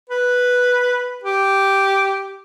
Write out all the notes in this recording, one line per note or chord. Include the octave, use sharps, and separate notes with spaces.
B4
G4